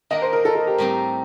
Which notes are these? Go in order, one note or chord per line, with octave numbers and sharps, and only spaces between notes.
D#3 A#3 D4 D#5
C5
A#4
A4
A4
G4
A2 G3 C4 D#4